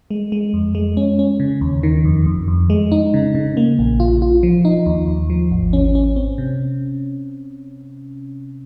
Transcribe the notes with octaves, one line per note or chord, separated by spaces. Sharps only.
G#3
G#3
F2
G#3
C#4
C#4
C#3
D#2
D#3
F2
F2
F2
G#3
D#4
C#3
C#3
A#3
A#1
F4
F4
F3
D#4
D#2
D#2
F3
G#1
C#4
C#4
C4
C3